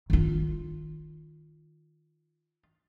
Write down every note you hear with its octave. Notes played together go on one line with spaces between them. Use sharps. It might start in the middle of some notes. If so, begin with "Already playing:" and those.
D#3 F4